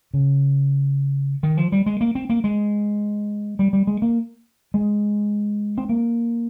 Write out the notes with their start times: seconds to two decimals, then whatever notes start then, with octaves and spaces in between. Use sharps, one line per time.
0.14 C#3
1.43 D#3
1.57 F3
1.72 G3
1.86 G#3
2.01 A#3
2.15 C4
2.30 A#3
2.44 G#3
3.59 G3
3.73 G3
3.87 G#3
4.02 A#3
4.74 G#3
5.78 C4
5.89 A#3